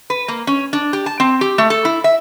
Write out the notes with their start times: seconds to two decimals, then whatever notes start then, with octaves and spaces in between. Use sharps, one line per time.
0.10 B4
0.28 A#3
0.47 C#4
0.73 D4
0.93 G4
1.06 A5
1.20 C4
1.41 G4
1.58 A3
1.70 A4
1.85 E4
2.04 E5